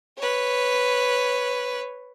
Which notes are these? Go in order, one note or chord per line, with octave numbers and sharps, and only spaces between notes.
B4 C#5